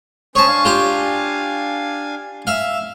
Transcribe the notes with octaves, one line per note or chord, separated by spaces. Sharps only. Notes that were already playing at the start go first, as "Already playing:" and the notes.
C#4 C5 C#5 A5 D#6
D4 F5 G#5
F4 G4 A#5
E5 F5